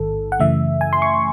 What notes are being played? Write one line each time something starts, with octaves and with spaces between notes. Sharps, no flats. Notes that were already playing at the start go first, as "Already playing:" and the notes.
Already playing: A1 G#2 D#3 A4
F#5
F#2 C#3 E3 A3 E5
G#5
C6
C#6